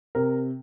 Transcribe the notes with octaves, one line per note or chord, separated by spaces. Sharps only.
C3 A#4